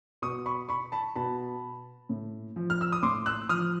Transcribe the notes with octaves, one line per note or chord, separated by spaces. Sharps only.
B2 C#6 D#6
B5 C#6
B5 C#6
A5 B5
B2 A5 B5
A2
F3
F6
E6
D#6
A2 C6 D6
E6 F#6
F3 D#6 F6